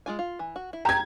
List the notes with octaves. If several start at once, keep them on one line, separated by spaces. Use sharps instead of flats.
G#3 F4 G#5
F4
E3
F#4
E4
G4 A#5 G#6